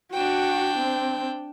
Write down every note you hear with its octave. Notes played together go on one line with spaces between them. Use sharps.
D4 F#4 G5
C4